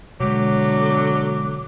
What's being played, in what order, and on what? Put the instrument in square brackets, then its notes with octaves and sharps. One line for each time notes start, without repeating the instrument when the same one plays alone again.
[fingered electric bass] B2 G#3 [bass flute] D3 [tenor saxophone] F#3 [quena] D6